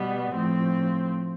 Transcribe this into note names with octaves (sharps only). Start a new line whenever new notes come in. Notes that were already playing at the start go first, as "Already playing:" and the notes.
Already playing: B2 G3 B3
A2 F3 C4